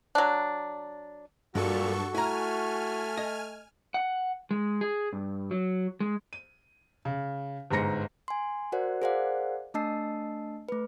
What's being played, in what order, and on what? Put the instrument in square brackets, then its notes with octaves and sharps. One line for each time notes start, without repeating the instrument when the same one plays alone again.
[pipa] F#3 D4
[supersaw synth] G2 A4 C#6 [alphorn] A#2 [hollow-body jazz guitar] F#3 G#3 [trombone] F#4
[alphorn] A3 [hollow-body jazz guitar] E4 A#5 [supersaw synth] G#5 F6
[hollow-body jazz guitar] D#5
[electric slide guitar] F#5
G#3
G#4
G2
F#3
G#3
[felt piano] D#7
C#3
G1 G#2 G#3 A#5 A#6 C#7
[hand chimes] G#5 C6
F#4 A#4 C5 D5 F#5
G#4 A#4 C5 D5 F5 F#5
A3 D4 D#5 A5 E6 C7
A3 B4